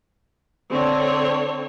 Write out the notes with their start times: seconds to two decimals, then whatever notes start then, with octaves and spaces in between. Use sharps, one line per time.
0.68 D3 C4 C#5